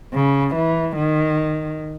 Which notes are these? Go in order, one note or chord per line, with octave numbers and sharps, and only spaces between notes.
C#3
E3
D#3